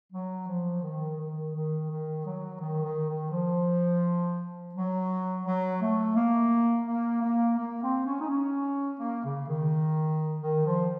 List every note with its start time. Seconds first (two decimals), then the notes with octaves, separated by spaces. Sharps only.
0.12 F#3
0.48 F3
0.83 D#3
1.18 D#3
1.55 D#3
1.90 D#3
2.25 F#3
2.60 D#3
2.84 D#3
3.08 D#3
3.31 F3
4.74 F#3
5.44 F#3
5.80 A3
6.16 A#3
6.86 A#3
7.22 A#3
7.57 A#3
7.82 C4
8.05 C#4
8.20 D#4
8.28 C#4
8.99 A#3
9.23 C#3
9.48 D#3
10.41 D#3
10.66 F3